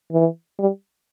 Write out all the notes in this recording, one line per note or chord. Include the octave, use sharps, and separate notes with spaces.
E3
G3